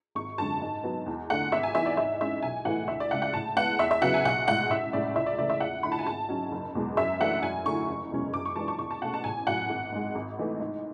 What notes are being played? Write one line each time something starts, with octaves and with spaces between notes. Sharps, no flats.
G#1 C#6
F#2 D3 G#3 A5
G#2
F#3 B3
E2
D3 A3 F#5
G#1 E5
G#5
G#2 E3 B3 E4 E5
D5
G#2 E5
G#3 C#4 E4 E5
B1 G#5
A2 E3 A3 E4 F#5
D2 E5
D5
C#3 G#3 F#5
F#5
A2 A5
G#3 B3 E4 F#5
E2 E5
E5
C#3 F#3 B3 F#5
G#5
B1 F#5
A2 G#3 F#5
A1 E5
A2 G#3 C#4 D5
C#2 E5
D5
C#3 E3 A3 D5
E5
E2 F#5
D3 A3 E4 B5
A5
G#5
G#1 A5
G#2 F#3 C#4
F#1
E2 B2 G#3
F#2 E5
E3 A3 D4 F#5
F#2 G#5
D3 A3 E4 C#6
F#1
E2 B2 G#3 C#4
F#2 D6
C#6
E3 G#3 D4 A5
C#6
E2 C#6
A5
B2 A3 C#4 F#5
A5
A1 G#5
A2 F#3 F#5
G#1
G#2 G#3
G#1
G#2 E3 A3
G#2